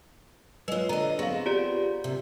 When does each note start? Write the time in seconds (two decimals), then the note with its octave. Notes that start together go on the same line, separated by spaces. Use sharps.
0.68 G#3 F4 B4 C#5
0.89 D3 D#5 A#5
1.19 B3 C4 G#4 F5
1.46 F4 G4 D5
2.04 C3